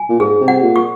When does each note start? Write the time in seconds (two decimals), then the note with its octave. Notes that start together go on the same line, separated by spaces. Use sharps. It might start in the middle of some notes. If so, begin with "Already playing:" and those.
Already playing: G#5
0.09 A#2
0.20 G#2 G#4
0.41 C3
0.48 F#5
0.62 A#2
0.76 C#6